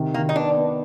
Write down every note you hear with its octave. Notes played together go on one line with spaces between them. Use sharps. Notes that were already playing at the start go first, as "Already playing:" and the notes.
Already playing: C3 D#3
D#3 A#3
D#4
B3 D4
B3